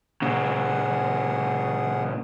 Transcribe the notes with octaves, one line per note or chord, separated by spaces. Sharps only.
A#2 C#3 G#4 F#5